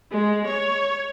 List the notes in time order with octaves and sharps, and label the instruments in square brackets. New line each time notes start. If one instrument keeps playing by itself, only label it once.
[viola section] G#3
C#5